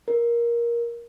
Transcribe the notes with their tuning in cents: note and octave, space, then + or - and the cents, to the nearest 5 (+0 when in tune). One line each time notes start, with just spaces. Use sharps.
A#4 +15